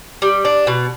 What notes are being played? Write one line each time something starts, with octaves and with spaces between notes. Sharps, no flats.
G3
D4
B2